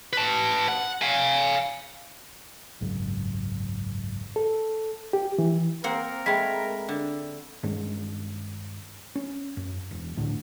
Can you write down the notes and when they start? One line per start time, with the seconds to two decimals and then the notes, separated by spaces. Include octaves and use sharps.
0.13 B4 A5
0.68 F#5
1.02 F5 G#5
2.81 G#1 C#2 F#2
4.36 A4
5.13 G4
5.38 E3
5.84 A#3 C4 A#4 F#5
6.26 G#3 A3 G5 B5 B6
6.89 D3
7.63 G2 D#3 G#3 C#4
9.15 C#4
9.57 F#2
9.91 E1
10.17 C#2 A2 D3